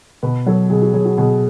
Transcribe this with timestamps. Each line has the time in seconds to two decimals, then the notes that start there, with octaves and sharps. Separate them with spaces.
0.23 B2 B4
0.46 F#3 A4
0.70 B2 G#4
0.82 F#4
0.94 F#3 G#4
1.05 F#4
1.17 B2 G#4